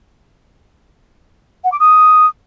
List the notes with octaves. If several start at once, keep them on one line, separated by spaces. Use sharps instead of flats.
F#5
D6
D#6